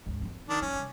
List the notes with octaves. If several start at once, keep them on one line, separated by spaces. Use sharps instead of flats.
G#1 D2
F3 C4
D#3 D4
F#2 C#4
C2